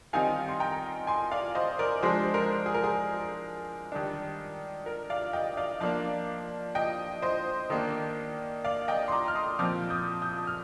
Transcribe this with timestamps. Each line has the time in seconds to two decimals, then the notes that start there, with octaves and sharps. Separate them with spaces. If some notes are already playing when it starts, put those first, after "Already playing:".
0.13 D#3 G3 C4 D#4 F5 G#5
0.49 C6
0.60 G5 A#5
1.07 G#5 C6
1.31 D5 F5
1.55 C5 D#5
1.79 A#4 D5
2.03 F3 G#3 D4 G#4 C5
2.34 A#4
2.66 G#4
2.74 A#4
2.84 G#4
3.92 D#3 G3 D4
4.86 A#4
5.10 D5 F5
5.33 D#5 G5
5.57 D5 F5
5.80 F3 A#3 D4 D5 F5
6.75 D#5 G5
7.22 C5 D#5
7.70 D#3 A#3 D4
8.64 D5 F5
8.88 D#5 G5
9.08 C6
9.12 A#5 D6
9.28 F6
9.35 C6 D#6
9.59 A#2 F3 C4 D6 F6
9.90 D#6 G6
10.22 D#6 G6
10.47 F6